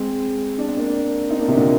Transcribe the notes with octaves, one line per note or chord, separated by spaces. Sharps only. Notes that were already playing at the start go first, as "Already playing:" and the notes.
Already playing: G#3 C4
D4
C4
A#3 D4
C4 D#4
A#3 D4
C3 D#3
A#2 D3